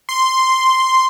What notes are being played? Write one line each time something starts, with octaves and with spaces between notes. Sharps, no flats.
C6